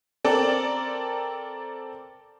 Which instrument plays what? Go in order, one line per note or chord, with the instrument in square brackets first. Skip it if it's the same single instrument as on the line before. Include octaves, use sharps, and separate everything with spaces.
[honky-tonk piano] C4 A4 A#4 D5